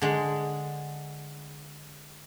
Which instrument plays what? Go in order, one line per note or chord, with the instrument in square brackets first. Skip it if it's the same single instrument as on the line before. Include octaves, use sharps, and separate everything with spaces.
[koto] D3 G#3